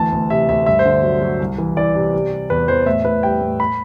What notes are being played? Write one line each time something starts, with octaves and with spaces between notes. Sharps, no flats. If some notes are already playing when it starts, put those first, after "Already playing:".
Already playing: D2 E3 A5
D2
C3 E5
D2 E5
G2 E5
C5
D3
F#3
F#3
C2
E3
E3 D5
C3
G3
G3
E2 B4
E2 C5
A2 E5
A2 B4
G3 G5
A2
B5